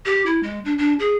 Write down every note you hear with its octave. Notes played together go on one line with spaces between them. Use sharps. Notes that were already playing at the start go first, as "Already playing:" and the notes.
G4
E4
G#3
D4
D4
G#4